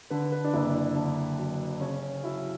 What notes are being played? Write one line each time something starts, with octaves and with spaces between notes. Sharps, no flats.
D3 B4
B4
D4
F#1 E4
D4
D3
F#3
C#3 C#4
F#3 E4